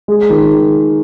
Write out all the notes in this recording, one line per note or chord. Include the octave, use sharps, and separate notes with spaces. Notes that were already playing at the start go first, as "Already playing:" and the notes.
G#3
D#3